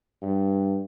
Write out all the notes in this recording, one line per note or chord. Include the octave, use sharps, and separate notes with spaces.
G2